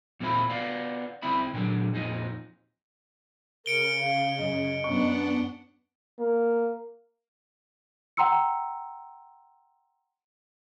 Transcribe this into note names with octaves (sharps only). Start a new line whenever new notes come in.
D#2 A#2 E3 C4 E4 B5
B3 D5 F5
C#2 C4 E4 E5 B5
A#2 D3 F#3
F2 A#2 D#4
C#3 A#4 C#7 D7 G7
F5
F#2 D#5
F#2 B3 D4 F#5 C#6
A#3
F#5 G5 A#5 C6 E6 C#7